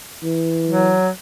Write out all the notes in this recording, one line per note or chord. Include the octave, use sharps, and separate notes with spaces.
E3
F#3